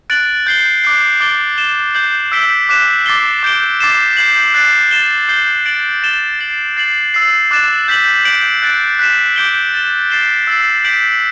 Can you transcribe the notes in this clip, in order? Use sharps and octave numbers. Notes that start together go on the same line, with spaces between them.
F#6 A6 D7 F#7
G6 C7 G7
D6 F#6 C7
D6 A6 D7 G7
A6 E7 G7
G6 C7 F#7
E6 G6 B6 D7 G7
D6 F#6 B6 E7
D6 A6 C7 G7
D6 G6 D7 G7
D6 A6 C7 E7
G6 C7 F#7
F#6 A6 C7
A6 E7 G7
G6 C7 G7
A6 D7 F#7
A6 E7 G7
A6 C7 F#7
A6 C7 F#7
E6 A6 C7
D6 F#6 A6 E7
G6 B6 F#7
G6 D7 F#7
F#6 A6 D7
F#6 B6 E7
D6 G6 D7 G7
A6 E7 G7
A6 C7 E7 G7
E6 A6 C7
G6 B6 D7 F#7